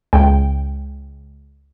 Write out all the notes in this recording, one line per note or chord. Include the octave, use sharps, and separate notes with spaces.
C#2 G5